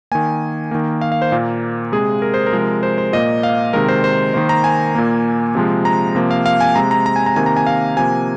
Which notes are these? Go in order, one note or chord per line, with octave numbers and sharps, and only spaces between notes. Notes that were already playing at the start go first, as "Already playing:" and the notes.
D#3 A#3 G#5
D#3 A#3
F5
F5
C5
A#2 A#3
C3 G#3 G#4
A#4
C5
A#4
C3 F3 G#3
C5
C5
A#2 A#3 D#5
F5
C3 D#3 G#3 A#4
C5
C5
D#3 A#3 C5
A#5
G#5
A#2 A#3
C3 F3 G#3
A#5
C3 F3 A#3
F5
F5
G#5
C3 G#3 A#5
A#5
A#5
G#5
A#5
C3 D#3 A#3 G#5
A#5
G#5
F5
C3 F3 A#3 G#5